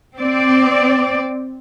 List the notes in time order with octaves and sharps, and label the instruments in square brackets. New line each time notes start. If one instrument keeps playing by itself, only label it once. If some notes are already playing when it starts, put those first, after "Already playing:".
[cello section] C4 D5